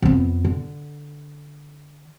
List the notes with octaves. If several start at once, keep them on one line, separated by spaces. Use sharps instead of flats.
F2 B3
D3